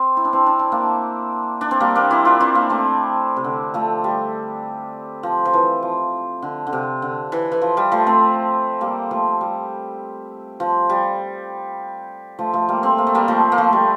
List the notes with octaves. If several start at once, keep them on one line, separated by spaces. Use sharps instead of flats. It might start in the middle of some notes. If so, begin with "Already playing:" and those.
Already playing: C4
E4
D4
C4 E4
D4
E4
A#3 D4
D4
C4
G3 A#3
A#3 D4
C4 E4
D4 F4
C4 E4
A#3 D4
A3 C4
C3
D3
F3 A3
G3
F3
F3
E3
F3
D3
D3
C3
D3
E3
E3
F3
G3
F3 A3
A3 C4
G3 A#3
F3 A3
G3
F3
G3
F3 A3
F3 A3
G3 A#3
A3 C4
A#3
A3
G3 A#3
F3 A3
A#3
F3 A3
G3